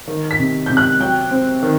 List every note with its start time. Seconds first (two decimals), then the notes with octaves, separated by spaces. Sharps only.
0.07 D#3
0.31 B6
0.39 C3
0.66 C3 G6
0.77 F#6
1.00 F#3 G5
1.31 C4
1.62 D#3